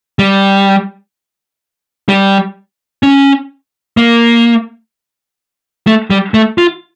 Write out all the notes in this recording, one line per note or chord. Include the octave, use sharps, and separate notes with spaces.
G3
G3
C#4
A#3
A3
G3
A3
F4